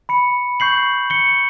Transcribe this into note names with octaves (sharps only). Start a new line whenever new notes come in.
B5 C#7
C#6 G6 C7 F#7
C#7 G7